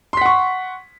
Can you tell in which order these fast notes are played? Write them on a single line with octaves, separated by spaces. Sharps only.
C6 B6 F#5 C#6